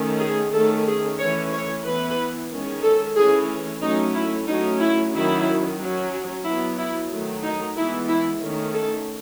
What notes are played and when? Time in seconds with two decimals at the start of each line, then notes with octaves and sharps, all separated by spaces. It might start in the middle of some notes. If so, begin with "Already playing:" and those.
Already playing: D#3 A3 C#4
0.21 G#4
0.54 D#3 A3 C#4 A4
0.86 G#4
1.19 E3 A3 C#4 C#5
1.53 C#5
1.84 E3 B3 B4
2.50 D#3 G#3 C#4
2.83 A4
3.16 E3 A3 C#4 G#4
3.81 F#3 A3 C#4 D#4
4.14 E4
4.47 F#3 A3 C#4 D#4
4.80 E4
5.13 D#3 F#3 C#4 E4
5.79 F#3 C#4
6.45 F#3 B3 E4
6.77 E4
7.10 D#3 F#3 A3
7.43 D#4
7.76 E3 G#3 B3 E4
8.09 E4
8.41 D#3 A3 C#4
8.74 A4